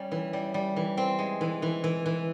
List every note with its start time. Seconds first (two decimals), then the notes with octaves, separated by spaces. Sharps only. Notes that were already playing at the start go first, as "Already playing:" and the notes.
Already playing: G3 C#4
0.12 E3
0.33 G3
0.54 G3
0.76 E3
0.97 C4
1.19 G#3
1.41 E3
1.62 E3
1.84 E3
2.06 E3